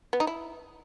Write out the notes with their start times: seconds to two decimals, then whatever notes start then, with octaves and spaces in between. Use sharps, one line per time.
0.13 B3
0.20 D#4
0.27 E4